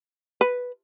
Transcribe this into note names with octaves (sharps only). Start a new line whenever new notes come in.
B4